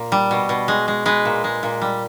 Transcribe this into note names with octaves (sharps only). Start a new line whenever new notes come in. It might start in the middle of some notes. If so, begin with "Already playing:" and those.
Already playing: A#2
G3
B2
B2
G#3
G#3
G#3 B4
A#2
G#3
A#2
G3